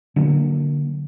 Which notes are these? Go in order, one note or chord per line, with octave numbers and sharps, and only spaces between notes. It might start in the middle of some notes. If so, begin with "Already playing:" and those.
D3 F#3 A3 A#3